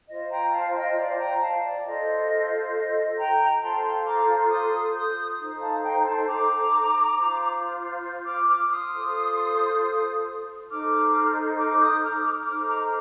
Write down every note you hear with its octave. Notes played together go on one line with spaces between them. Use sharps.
F4 C5 D#5
G5 A#5
F5 A5
D#5 G5
D5 F5
G5 A#5
F5 A5
D5
F4 A4 C5 D#5
D#5
G5 A#5
F4 A4 C5 A5 C6
A#5 D6
C6 D#6
D#6 G6
D#4 A4 C5
F5 A5
G5 A#5
A#5
A5 C6
A#5 D6
F4 C5
D6 F6
D6 F6
C6 D#6
F4 A4 C5
D#4 A4 C5 D6 F6
D6 F6
D#6 G6
D6 F6
D6 F6
D#4 A4 C5 D6 F6
A#5 D6